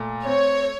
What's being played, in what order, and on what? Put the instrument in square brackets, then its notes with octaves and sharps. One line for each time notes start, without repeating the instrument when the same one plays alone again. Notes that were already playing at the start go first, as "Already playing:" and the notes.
Already playing: [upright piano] A#2 A3
[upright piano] C4 [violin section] C#5